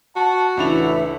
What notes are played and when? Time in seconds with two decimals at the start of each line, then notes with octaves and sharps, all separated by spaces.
0.16 F#4 A5
0.57 C#2 A2 E3 D4 E4 E5 B5 F7